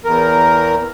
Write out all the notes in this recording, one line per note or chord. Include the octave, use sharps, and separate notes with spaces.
E2 A#4